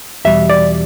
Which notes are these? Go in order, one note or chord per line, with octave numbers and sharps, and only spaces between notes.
E2 B2 G3 E5
D5